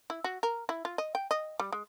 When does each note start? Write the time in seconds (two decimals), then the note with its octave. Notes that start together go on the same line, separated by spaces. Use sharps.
0.10 E4
0.24 F#4
0.43 A#4
0.69 E4
0.85 F4
0.98 D#5
1.15 G5
1.31 D#5
1.60 G3
1.72 G#3